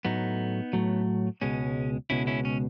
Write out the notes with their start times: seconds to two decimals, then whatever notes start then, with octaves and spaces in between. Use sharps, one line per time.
0.05 A2 F#3 A3 B3 D#4
0.73 A2 F#3 A3
1.42 C#2 B2 G#3 C#4
2.10 C#2 B2 G#3 C#4 E4
2.27 C#4 E4
2.45 C#4